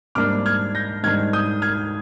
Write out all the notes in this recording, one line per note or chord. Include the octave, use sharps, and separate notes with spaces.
G#2 G3 A#3 D4 D6 F6
F6 G#6
G6 A#6
G#2 D#3 G3 D4 F6 G#6
D#6 G6
F6 G#6